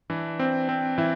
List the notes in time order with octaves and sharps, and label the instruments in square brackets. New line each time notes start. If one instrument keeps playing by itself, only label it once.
[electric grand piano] E3 [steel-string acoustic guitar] D4
[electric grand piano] C4
C4
[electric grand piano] E3 [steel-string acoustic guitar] E4